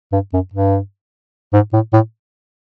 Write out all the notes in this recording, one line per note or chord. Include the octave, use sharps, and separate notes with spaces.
G2
F#2
G2
G#2
A2
A2